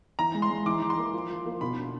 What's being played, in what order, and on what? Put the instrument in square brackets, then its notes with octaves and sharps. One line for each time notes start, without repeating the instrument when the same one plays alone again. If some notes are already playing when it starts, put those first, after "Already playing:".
[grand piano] E3 [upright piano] A#5
[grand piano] G#3
[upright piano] C6
[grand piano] G#3
[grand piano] E3 [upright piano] D6
[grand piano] E3
[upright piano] C6
[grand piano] A#3
F3
F3
A#3
[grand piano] B2 [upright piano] B5
[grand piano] D4